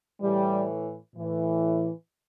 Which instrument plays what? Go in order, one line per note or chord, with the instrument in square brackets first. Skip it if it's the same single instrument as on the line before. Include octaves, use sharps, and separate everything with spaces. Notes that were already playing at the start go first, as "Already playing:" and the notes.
[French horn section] A2 E3 G3
A2 E3